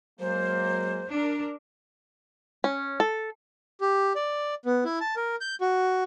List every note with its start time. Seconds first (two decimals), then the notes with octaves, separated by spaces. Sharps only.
0.20 F#3 G#3 A#3 C5
1.10 D4 A#4
2.64 C#4
3.00 A4
3.81 G4
4.16 D5
4.65 B3
4.85 E4
5.00 A5
5.16 A#4
5.41 G6
5.61 F#4